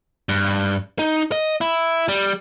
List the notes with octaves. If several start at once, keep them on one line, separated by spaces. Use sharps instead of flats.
G2
D#4
D#5
E4
G3